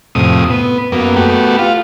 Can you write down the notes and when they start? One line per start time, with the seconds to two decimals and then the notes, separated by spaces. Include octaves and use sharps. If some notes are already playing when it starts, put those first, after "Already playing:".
0.15 F2 A2 C3 D#6
0.50 B3
0.92 F#2 A#3 B3
1.16 A3 B3 F#4 G4
1.59 F4